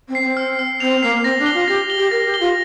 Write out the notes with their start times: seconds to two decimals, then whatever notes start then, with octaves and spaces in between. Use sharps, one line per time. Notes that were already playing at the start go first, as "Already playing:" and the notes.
0.08 C4
0.15 C7
0.22 C4
0.37 F6
0.59 F6
0.80 C4 F7
1.03 A#3 C7
1.24 C4 A#6
1.39 D4
1.46 G7
1.54 F4
1.68 G4 A#6
1.90 G7
1.97 G4
2.11 A#4 A#6
2.26 G4
2.34 G7
2.40 F4